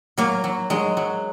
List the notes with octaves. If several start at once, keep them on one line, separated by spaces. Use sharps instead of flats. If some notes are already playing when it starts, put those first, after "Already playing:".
F#3 A#3
F#3
F#3 G#3
F#3